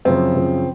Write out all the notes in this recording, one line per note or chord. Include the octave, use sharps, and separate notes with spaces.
F#2 C#3 F3 C4
F#2 C#3 F3